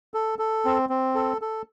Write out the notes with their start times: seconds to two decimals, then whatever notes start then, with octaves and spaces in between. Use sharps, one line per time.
0.14 A4
0.39 A4
0.65 C4
0.89 C4
1.15 A4
1.42 A4